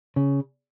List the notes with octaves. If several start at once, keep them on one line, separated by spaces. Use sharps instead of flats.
C#3